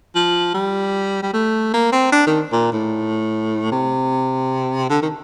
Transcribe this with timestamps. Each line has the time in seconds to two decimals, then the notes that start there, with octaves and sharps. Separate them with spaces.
0.15 F3
0.54 G3
1.23 G3
1.34 A3
1.74 A#3
1.92 C4
2.12 D4
2.26 D#3
2.52 A#2
2.72 A2
3.71 C3
4.90 D3
5.02 D#3